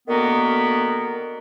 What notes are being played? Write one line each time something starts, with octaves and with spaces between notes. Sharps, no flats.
D3 D#3 A#3 B3 F#4 A#4